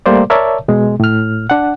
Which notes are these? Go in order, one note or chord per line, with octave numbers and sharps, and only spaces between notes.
G3 A3 A#3 C5 D5
A#4 C#5 D5 E5 A5
B2 G#3
A2 F6
D4 F#5